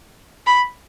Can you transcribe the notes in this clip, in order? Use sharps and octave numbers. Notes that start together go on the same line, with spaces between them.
B5